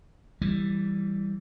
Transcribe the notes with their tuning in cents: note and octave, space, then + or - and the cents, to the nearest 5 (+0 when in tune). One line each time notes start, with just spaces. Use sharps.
E3 +0 G3 +0